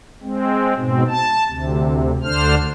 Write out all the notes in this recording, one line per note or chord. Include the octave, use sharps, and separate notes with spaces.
G#3 C4
G#2 B2 C4
A5
D2 C3
D2 D3 D4 C5 F6